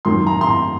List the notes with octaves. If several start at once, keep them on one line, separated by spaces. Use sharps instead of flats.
F#2 D#3 F#3 C6
A#5
C6
A#5